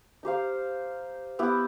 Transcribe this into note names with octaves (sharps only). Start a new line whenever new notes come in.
D#4 G4 C5 F5
B3 E4 G4